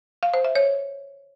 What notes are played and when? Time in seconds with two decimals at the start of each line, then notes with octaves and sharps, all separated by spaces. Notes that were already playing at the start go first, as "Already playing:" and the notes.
0.23 F5
0.34 C5
0.45 E5
0.55 C#5